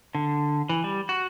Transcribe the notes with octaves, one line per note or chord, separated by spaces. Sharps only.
D3
E3
G3
F#4